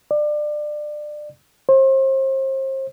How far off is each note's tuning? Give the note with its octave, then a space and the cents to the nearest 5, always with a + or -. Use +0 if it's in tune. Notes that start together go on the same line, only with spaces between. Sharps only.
D5 +25
C5 +35